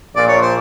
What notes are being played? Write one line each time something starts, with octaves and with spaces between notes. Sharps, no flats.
A#1 A#2 D5
C#5
C5